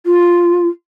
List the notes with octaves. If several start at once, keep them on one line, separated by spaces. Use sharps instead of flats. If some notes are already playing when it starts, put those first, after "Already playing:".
F4